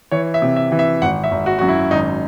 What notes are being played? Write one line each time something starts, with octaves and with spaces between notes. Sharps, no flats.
E3 C#5
E5
C3
E5
E3
E5
G#1 F#5
E5
G#1
F#4
F#2 F#4
E4
G#1 D#4